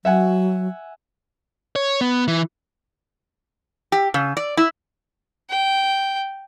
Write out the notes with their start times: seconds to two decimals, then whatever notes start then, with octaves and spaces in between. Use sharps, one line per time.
0.05 F#3 E5 F#5 G#5
1.76 C#5
2.01 B3
2.28 E3
3.92 G4
4.14 C#3
4.37 D5
4.57 E4
5.50 G5